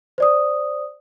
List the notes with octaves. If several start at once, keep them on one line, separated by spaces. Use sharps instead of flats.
C5 D5 D#6